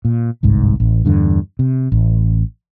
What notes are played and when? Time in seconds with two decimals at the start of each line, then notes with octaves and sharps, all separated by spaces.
0.05 A#2
0.43 G1 C2 G#2
0.80 A1
1.05 E2 G2 D3
1.59 C3
1.92 A1